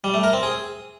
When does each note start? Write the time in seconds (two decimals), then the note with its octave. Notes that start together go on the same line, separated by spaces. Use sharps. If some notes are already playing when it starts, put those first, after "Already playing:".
0.04 G3
0.14 A3
0.24 A#4
0.33 C4
0.43 G#4